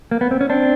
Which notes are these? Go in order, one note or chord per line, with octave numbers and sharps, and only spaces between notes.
A#3
B3
C4
C#4
C4 D4